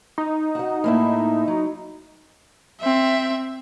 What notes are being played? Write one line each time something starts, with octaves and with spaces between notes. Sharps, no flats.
D#4
F#4 F#5
A2 A#3 E4
F#3
C4 E5